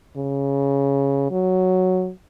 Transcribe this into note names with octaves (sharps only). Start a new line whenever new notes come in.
C#3
F#3